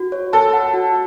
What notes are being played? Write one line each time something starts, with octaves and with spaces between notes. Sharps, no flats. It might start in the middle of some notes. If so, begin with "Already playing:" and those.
Already playing: F#4
C#5
A4 A5
F#5
F#4